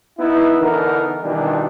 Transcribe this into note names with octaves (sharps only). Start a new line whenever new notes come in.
B3 D#4 E4
D3 E3 B3 D#4 A#4
B2 D#3 E3 G3 D4